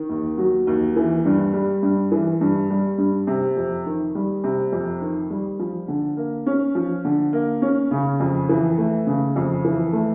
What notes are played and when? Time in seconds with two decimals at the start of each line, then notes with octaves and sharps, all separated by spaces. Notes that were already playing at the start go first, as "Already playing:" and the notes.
Already playing: D#3
0.09 D#2
0.38 F#3
0.67 D#2
0.96 E3
1.25 G2
1.53 G3
1.83 G2
2.12 E3
2.41 G2
2.70 G3
2.98 G2
3.27 C3
3.57 F2
3.86 D#3
4.15 G3
4.44 C3
4.72 F2
5.01 D#3
5.30 G3
5.59 F3
5.88 D3
6.17 A#3
6.46 C#4
6.75 F3
7.05 D3
7.33 A#3
7.62 C#4
7.91 C#3
8.20 F2
8.49 E3
8.78 A3
9.07 C#3
9.36 F2
9.65 E3
9.93 A3